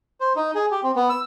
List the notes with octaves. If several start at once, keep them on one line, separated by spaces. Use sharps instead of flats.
C5
D#4
G#4
G4
C4
B3
E6